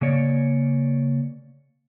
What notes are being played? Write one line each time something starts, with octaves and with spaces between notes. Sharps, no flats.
C#3 A#3 C#5 D5